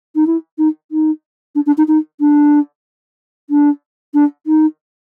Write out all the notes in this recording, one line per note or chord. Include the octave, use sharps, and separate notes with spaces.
D#4
E4
D#4
D#4
D4
D4
D#4
D#4
D4
D4
D4
D#4